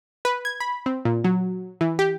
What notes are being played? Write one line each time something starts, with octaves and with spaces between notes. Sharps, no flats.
B4
G#6
B5
C4
A#2
F#3
E3
G4